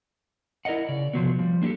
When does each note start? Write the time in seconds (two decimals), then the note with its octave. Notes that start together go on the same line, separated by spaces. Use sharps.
0.65 E4 A#4 D5 D#5 F#5
0.88 C#3 D5
1.13 C3 F3 F#3 B3
1.39 F3 G3
1.62 A#3 D4 F#4 G4 A4